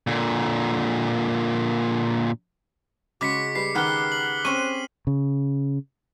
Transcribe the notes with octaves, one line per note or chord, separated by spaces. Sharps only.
A#2 D3
C#3 G#3 F#4 D6 B6 C#7
G3 B4 C7
D#3 G4 A#4 B4 F#5 F6 F#6 G7
F#7
C4 C#4 C#6 D#7
C#3